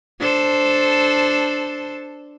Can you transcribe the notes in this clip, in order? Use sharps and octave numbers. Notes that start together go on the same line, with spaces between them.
D4 A4 C5